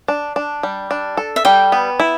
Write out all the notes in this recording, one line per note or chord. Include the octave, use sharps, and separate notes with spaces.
D4
D4
G3
D4
A4
E5
G3 G5
B3
E4